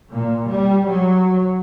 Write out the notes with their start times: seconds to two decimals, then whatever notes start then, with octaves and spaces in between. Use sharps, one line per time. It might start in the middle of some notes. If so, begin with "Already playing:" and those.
0.12 A#2
0.49 G3
0.87 F#3